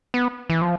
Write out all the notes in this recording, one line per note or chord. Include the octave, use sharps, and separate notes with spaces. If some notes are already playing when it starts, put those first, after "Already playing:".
B3
E3
F3